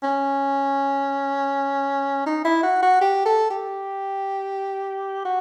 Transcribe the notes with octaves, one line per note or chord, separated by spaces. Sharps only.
C#4
D#4
E4
F#4
F#4
G4
A4
G4
F#4